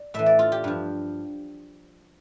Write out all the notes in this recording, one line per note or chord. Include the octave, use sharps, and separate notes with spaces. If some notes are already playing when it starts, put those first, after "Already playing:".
Already playing: D5
A2 E3 E5
D5
F4
G4
G2 F3